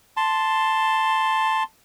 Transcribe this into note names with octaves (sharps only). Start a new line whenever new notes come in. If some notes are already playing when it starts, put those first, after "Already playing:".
A5 C6